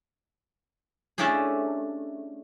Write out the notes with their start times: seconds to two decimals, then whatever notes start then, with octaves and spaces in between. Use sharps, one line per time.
1.18 A3 C#4 D4 E4 G4 G#4